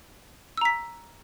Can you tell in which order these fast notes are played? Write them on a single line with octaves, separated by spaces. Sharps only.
E6 A#5 B6